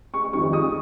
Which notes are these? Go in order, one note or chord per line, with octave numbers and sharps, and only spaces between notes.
C#6
F2 D#3 G3 C#6
D#6